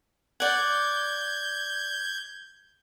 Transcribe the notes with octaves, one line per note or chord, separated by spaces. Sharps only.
D5 F#5 G6 G#6